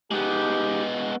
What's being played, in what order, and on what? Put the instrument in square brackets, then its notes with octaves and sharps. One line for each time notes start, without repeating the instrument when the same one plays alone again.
[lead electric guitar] G#3 B3 [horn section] D#4 G4